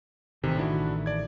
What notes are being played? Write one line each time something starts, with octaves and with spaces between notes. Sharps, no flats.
A1 C3 D#3 E3
D4 E4 F#4
D5 G#6